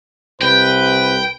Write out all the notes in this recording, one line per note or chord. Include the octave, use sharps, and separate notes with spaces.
C2 B4 G5